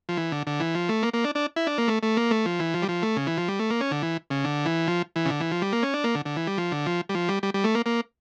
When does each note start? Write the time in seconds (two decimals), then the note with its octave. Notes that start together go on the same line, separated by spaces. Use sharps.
0.09 F3
0.17 E3
0.32 D3
0.47 D3
0.60 E3
0.75 F3
0.89 A3
1.03 A#3
1.13 A#3
1.25 D4
1.35 D4
1.56 E4
1.67 D4
1.78 A#3
1.88 A3
2.03 A3
2.17 A#3
2.31 A3
2.46 F3
2.59 E3
2.74 F3
2.82 G3
2.89 F3
3.02 A3
3.17 C#3
3.27 E3
3.37 F3
3.48 G3
3.59 A3
3.70 A#3
3.81 C#4
3.91 D3
4.02 E3
4.30 C#3
4.44 D3
4.66 E3
4.87 F3
5.16 E3
5.25 C#3
5.30 D3
5.40 E3
5.51 F3
5.62 G3
5.73 A#3
5.83 C#4
5.94 D4
6.04 A#3
6.15 D3
6.26 D3
6.36 E3
6.47 G3
6.58 F3
6.72 D3
6.86 F3
7.09 G3
7.15 F3
7.29 G3
7.43 G3
7.54 G3
7.64 A3
7.75 A#3
7.86 A#3